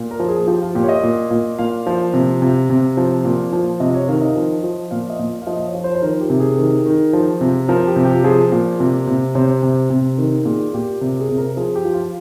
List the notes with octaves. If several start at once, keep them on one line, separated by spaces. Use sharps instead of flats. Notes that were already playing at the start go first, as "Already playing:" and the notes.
Already playing: A#2
A#4
F3
G#4
F3 G4
F4
A#2 G4
C#5
D#5
A#2
A#2
A#2 F5
F3
C3
C3
C3
F3
A#2
F3
C3 D#5
C#5
D#3 F5
D#5
F3
F3
A#2 F5
D#5
A#2
F5
F3 D#5
D#5
C#5
F3
C5
C5
D#3 A#4
G4
C3
G#4
D#3
D#3
F3
C3
F3 A#4
G4
C3
G4
F3 G#4
A#2
C3
C3
C3 C5
C3
C3
D#3
A#2 G#4
A#2 G4
C3 G4
G#4
C3
A#4
F3 G#4
G4
F3
F4